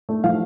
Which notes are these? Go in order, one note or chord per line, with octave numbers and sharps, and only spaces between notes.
A3
F3 F5